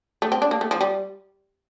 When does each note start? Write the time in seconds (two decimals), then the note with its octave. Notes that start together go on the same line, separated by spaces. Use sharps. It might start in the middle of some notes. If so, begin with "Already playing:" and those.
0.22 A3
0.32 C4
0.42 D4
0.51 A#3
0.61 A3
0.71 F3
0.81 G3